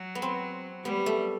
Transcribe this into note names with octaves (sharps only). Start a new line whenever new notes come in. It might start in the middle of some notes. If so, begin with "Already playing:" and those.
Already playing: F#3
B3
C4
G3 B3
A3